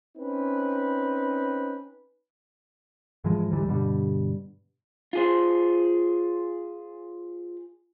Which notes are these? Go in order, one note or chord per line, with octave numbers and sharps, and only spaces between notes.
C4 C#4 D#4 B4
G#2 E3 F3 G#3
D2 G#2 E3 G3
G2 B2 D3 G3
F4 G#4 C5